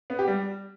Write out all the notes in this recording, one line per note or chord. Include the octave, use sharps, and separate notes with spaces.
B3
G4
G3